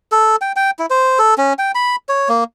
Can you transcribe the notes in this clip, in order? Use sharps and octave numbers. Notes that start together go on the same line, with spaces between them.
A4
G5
G5
E4
C5
A4
C#4
G5
B5
C#5
A#3